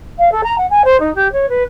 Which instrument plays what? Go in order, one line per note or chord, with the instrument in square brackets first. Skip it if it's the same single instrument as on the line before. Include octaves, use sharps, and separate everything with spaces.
[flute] F5
A4
A#5
F#5
G#5
C5
D#4
G4
C#5
B4